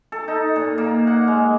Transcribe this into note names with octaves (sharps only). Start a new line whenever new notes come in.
A4
D#4
A#2
A#3
F#5
G#3